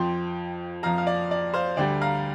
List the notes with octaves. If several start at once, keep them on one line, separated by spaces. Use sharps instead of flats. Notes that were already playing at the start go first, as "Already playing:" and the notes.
Already playing: F2 F3 G5 C6
F2 F3 F5 A#5
F5
D5
D5
C5 F5
D2 D3 G3 D5 G5
F5 A#5